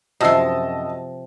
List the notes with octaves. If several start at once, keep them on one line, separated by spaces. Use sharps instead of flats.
F#2 C3 F3 F4 F#4 D#5 A5 E6